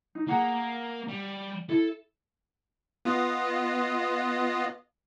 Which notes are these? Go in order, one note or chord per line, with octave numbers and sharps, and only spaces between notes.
D#4
A#3 G#4 F#5 A#5
G3
E4 A4
B3 F4 D#5